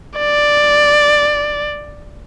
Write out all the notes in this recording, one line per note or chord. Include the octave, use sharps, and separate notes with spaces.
D5